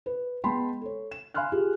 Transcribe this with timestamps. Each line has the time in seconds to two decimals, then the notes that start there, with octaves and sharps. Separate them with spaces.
0.06 B4
0.44 G#3 B3 G5 A5 B5 C6
0.81 A4 C#5
1.11 E7
1.34 F5 G#5 B5 C6 F6 F#6
1.52 F4 G4 G#4